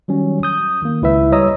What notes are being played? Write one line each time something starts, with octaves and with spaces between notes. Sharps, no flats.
D#3 F#3 G3 C#4
D#6 G6
D#3 A#3
C#2 E4 B4 E5
G3 C#5 D#5 A#5 D#6 E6